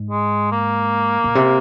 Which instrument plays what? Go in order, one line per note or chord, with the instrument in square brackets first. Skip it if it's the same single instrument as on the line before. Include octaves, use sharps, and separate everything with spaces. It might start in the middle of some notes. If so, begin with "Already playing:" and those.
Already playing: [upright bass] G#2
[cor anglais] G#3
A#3
[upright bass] A#2
C3